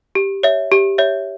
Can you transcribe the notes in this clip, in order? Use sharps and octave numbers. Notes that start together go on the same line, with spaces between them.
G4
C#5 E5
G4
C#5 E5